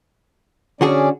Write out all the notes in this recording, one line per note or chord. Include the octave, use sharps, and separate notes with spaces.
D3 C#4 F#4 G#4 D5